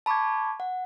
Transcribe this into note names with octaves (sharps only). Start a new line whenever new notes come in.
A5 B5 C#6 D6 G#6
F#5